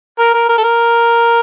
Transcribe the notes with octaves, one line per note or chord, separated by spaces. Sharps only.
A#4
A#4
A#4
A4
A#4